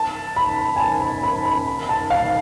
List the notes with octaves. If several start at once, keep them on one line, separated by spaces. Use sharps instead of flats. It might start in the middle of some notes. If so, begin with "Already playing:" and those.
Already playing: A5
B5
G#5
A5
B5
B5
B5
A5
F5